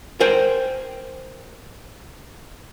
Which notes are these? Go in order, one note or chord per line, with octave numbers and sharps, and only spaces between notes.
A#4 C5 G5 G#5